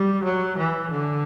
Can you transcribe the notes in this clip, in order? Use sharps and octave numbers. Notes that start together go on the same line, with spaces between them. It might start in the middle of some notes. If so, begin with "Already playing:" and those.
Already playing: G3
F#3
E3
D3